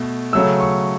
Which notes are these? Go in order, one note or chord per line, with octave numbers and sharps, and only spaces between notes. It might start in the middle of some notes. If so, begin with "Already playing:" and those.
Already playing: B2 A3
C#3 F#3 A3 E6
C#6